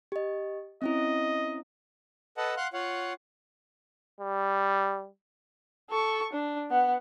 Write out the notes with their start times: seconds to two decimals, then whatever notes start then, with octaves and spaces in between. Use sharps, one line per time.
0.12 G4 D#5
0.82 C4 C#4 E4 D#5
2.37 A4 B4 D#5 F#5 A5
2.57 F5 F#5 C6 F#6
2.73 F4 C#5 F5 F#5
4.20 G3
5.90 A4 C#6
6.33 D4
6.71 B3 F#5